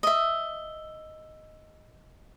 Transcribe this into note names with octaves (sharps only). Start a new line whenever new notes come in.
D#5 E5